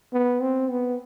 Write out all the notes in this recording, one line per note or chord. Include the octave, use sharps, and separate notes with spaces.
B3
C4
B3